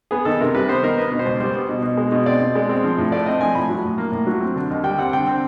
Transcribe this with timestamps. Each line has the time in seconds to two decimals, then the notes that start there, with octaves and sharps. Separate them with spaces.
0.11 B3 G#4
0.25 D#3 A4
0.41 C3 A#4
0.55 G3 B4
0.69 B3 C5
0.83 D#3 A#4
0.98 B3 B4
1.12 B2
1.19 C5
1.25 C#2
1.40 G3 C5
1.55 B3
1.69 B2
1.83 B2
1.97 G#3
2.12 B2
2.26 C4 D5
2.40 B2
2.55 G#3
2.69 C4
2.84 F3
2.98 A2
3.12 A3 D5
3.26 C4 D#5
3.41 F3 G#5
3.55 A2 B5
3.69 F#3
3.84 A2
3.98 A#3
4.12 A2
4.27 F#3
4.41 C4
4.56 D3
4.70 D#2
4.84 G3 G5
4.98 C4 F#5
5.13 D3 G5
5.27 C4